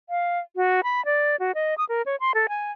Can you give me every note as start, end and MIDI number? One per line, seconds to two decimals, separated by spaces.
0.10 0.39 77
0.56 0.81 66
0.84 1.04 83
1.05 1.36 74
1.40 1.52 66
1.55 1.74 75
1.78 1.84 87
1.89 2.02 70
2.06 2.16 73
2.20 2.32 84
2.35 2.47 69
2.49 2.72 80